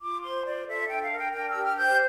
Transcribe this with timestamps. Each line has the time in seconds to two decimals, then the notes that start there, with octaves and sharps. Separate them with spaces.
0.01 F4 D6
0.22 C5 C6
0.45 F4 D5
0.66 A4 E5
0.88 D4 G5
1.03 F5
1.10 A#4
1.18 G5
1.33 D4 G5
1.47 E6
1.54 G4
1.62 F6
1.76 C5 G6